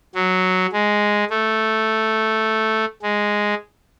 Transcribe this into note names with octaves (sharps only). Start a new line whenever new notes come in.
F#3
G#3
A3
G#3